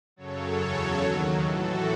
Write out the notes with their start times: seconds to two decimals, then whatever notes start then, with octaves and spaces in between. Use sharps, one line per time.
0.16 F#2 C#3 F#3 A4 C#5
0.59 E2 C#3 F#3
1.01 D#2 D#3 F#3
1.43 A2 E3 F#4 A4